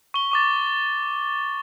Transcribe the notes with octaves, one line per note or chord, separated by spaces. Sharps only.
C#6 G7
C#6 D6 A6